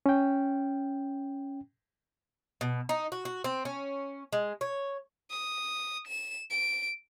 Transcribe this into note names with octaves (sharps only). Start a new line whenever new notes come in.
C#4 G5
B2
D#4
F#4
F#4
C4
C#4
G#3
C#5
D#6
E7
D7